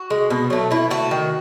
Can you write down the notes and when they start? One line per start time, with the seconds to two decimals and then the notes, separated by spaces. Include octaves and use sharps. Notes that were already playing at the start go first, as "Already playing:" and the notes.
Already playing: F#4
0.10 G#3
0.30 B2
0.50 F#3 A3
0.71 B2 E4
0.90 A3 F#4
1.11 D#3